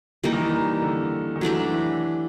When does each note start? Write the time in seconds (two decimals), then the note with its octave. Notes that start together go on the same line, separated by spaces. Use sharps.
0.24 E3 G3 A#3 D#4
0.33 D#3
0.42 E3
0.82 D3
1.36 D#3
1.41 E3 F#3 A3 D4 G4
1.71 E3